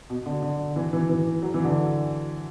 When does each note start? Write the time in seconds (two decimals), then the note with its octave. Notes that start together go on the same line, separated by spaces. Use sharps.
0.10 B2
0.26 D3
0.42 D3
0.76 E3
0.93 E3
1.09 E3
1.42 F#3
1.54 E3
1.64 D3